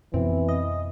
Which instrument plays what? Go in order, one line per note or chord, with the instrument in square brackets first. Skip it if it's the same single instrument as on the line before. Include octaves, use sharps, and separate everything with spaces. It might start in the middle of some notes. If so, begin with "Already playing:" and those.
[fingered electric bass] F2 B2 B3 [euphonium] E3 [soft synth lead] C4
[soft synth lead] D#5